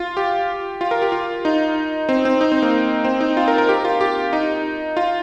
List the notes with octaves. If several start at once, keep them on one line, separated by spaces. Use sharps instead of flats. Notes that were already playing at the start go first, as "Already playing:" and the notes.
Already playing: F4
G4
F4
A#4
G4
F4
D#4
C4
C4
D#4
C4
A#3
C4
D#4
F4
A#4
A#4
G4
F4
G4
D#4
F4